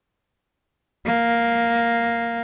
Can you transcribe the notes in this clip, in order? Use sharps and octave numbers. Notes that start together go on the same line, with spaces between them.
A#3